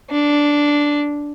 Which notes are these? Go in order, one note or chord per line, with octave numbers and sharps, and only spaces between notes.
D4